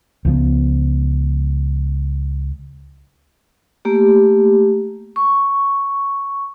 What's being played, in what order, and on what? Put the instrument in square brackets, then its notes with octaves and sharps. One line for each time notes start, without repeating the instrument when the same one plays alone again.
[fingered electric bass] C#2 F3 B3
[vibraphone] A3 A#3 G4
C#6